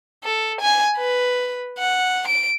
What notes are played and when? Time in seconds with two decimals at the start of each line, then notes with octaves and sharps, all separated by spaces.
0.24 A4
0.61 G#5
0.97 B4
1.79 F#5
2.28 D7